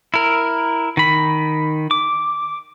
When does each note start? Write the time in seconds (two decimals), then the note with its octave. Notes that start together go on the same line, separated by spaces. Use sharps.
0.14 E4 A#4
0.97 D#3 B5
1.91 D6